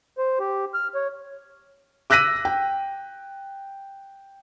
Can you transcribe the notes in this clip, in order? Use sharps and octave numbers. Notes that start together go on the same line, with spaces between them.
C5
G4
F6
C#5
D6 E6 F#6 A#6 B6 D#7
G5